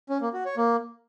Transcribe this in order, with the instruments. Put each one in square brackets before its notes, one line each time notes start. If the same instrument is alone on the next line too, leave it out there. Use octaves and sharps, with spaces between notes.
[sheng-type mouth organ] C#4
A#3
F#4
C#5
A#3